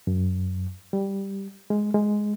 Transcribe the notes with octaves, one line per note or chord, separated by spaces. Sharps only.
F#2
G3
G#3
G#3